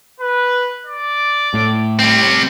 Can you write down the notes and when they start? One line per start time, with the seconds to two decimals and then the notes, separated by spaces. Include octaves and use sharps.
0.20 B4
0.86 D5
1.54 A2
1.99 G3 C4